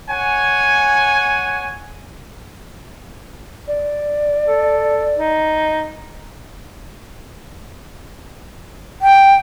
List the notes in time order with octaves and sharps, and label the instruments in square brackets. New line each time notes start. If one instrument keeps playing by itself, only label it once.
[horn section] C#5 F#5 G#5
[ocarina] D5
[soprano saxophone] A4
D#4
[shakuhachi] G5